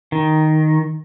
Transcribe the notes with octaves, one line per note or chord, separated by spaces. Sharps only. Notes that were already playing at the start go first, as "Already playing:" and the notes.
D#3